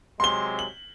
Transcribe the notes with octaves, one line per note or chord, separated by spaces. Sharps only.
C3 F#3 G#3 C6 G7
F#7